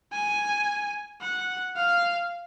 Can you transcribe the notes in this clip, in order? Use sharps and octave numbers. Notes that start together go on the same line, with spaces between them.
G#5
F#5
F5